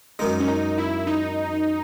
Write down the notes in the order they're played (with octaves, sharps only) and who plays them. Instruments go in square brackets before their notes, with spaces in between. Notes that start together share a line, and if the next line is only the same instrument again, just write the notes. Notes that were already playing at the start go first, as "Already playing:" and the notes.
[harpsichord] F#2 D#3 G#3 [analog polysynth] D#4
[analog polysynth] C#4
D#4
E4
D#4